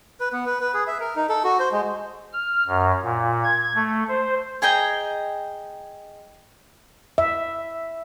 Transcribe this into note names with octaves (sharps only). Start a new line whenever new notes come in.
B4
B3
B4
B4
G#4
E5
A#4
D#4
A4
F#4
C5
G#3
F6
F#2
A#2
G#6
A3
C5
G#4 D#5 G5 A#5
E5